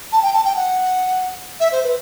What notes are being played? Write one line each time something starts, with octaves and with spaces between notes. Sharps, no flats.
A5
G5
A5
G5
F#5
E5
C5
B4